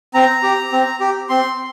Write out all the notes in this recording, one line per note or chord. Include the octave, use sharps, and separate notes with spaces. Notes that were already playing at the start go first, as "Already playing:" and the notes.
C4 A#5
G4
C4
G4
C4 C6